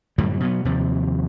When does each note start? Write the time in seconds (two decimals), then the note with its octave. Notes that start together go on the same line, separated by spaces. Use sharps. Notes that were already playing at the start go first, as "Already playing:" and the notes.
0.18 F#2 A2 D3 G3
0.40 B2 F#3 B3
0.65 D#2 C3 F3